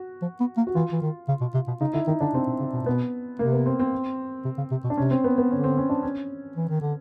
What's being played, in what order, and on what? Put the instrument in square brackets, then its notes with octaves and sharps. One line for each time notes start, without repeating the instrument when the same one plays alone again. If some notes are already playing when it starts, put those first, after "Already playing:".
Already playing: [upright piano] F#4
[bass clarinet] F3
B3
A#3
[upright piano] F#4
[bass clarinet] E3 [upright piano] F4
[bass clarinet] E3
D#3
C#3
B2
C3
B2
[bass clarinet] C#3 [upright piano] D#4
[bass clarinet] D3 [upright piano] E4
[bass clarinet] D#3 [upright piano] D#4
[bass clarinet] D3 [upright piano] D4
[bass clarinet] C3 [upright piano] C4
[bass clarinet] B2
C#3
B2
A#2
[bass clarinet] B2 [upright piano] B3
[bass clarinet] C3 [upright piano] A#3
[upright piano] B3
C4
C4
[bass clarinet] C3
C#3
C3
B2
[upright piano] D4
[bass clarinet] C3 [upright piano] C#4
[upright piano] C4
B3
B3
[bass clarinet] D3 [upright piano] C#4
[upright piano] C4
C#4
D4
C#4
[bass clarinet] E3
D#3
D3